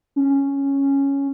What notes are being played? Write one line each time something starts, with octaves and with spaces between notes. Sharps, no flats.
C#4